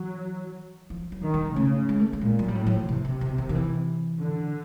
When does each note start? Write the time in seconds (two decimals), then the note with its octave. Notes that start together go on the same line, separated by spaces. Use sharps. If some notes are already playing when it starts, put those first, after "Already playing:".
Already playing: E3 F#3
0.90 F3
1.12 F#3
1.22 D#3
1.34 G3
1.56 C#3 A3
1.89 G#3
2.00 A3
2.13 G3
2.21 A#2 G#3
2.39 F#3
2.48 G3
2.54 A2 F#3
2.66 F#3
2.72 F3
2.88 C3 E3
3.05 D3
3.21 D3
3.38 D#3
3.49 D#3
3.55 E3
4.20 D3